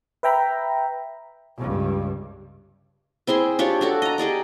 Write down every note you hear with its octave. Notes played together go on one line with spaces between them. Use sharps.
B4 E5 G5 A#5 B5
C#2 G2
C4 E4 G#4 C6
D4 F4 G4 C#5
D4 F#4 A4
D#5 A#5
G4 G#4 D5 D#5